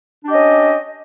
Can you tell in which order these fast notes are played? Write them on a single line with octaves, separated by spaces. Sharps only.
D4 G4 D#5 C#4